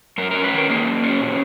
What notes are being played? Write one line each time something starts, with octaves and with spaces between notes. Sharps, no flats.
F#2 A#4
C#4 A#4
B4
D#3 A#4
A#3 G#4
F#2
C#4
A#2